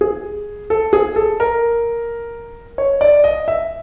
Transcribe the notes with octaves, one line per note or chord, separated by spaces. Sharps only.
G#4
A4
G#4
A4
A#4
C#5
D5
D#5
E5